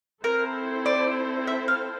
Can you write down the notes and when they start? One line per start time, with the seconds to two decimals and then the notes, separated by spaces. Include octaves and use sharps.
0.24 C4 E4 A4 A#4 C5
0.86 D5
1.47 E5
1.68 F5